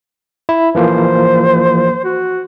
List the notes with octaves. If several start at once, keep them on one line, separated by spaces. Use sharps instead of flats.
E4
E3 F3 A#3 C5
F#4